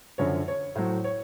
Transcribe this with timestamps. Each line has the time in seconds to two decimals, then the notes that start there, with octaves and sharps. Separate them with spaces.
0.18 F#2 D3 F3 C#5
0.48 C#5
0.75 A2 F#3 C5
1.04 C#5